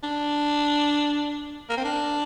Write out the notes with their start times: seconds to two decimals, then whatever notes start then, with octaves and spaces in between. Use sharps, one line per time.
0.03 D4
1.69 A#3
1.77 C4
1.84 D4